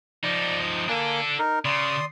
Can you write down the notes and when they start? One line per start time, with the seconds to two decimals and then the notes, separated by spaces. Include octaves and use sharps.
0.23 F3 D#4 D5
0.60 D#6
0.89 A#3 D4 A4 G#5
1.39 D#4 A#4
1.65 C#3 D5 C6 D#6